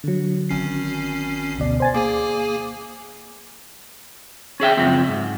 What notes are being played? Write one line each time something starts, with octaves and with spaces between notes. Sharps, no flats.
D3 F#3
G#1 C#4 C7
D2 B2 D5
C5 G#5 A6
A#3 G#4 G#5 D6
C#4 G#4 E5 G5
C#2 F#2 F3 C4
G#2